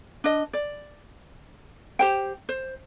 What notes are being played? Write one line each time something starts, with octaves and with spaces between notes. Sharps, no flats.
D4 D#5
D5
G4 C5 G5
C5